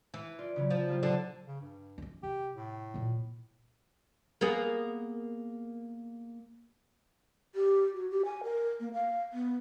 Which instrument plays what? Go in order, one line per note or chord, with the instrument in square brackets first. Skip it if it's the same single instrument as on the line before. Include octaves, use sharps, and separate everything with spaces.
[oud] E3
[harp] F4 D5
C#3 E3 F#3
[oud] F3
[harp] G3 A#3 F4
[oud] D3 D4 A4
[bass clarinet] C#3
G2
[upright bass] C#4 D#4
[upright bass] C3 [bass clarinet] G4
[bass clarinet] A2
[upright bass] A#2 D#4
[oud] A#3 B3 G#4
[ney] G4
F#4
G4
G#5
A#4
A#3
F5
B3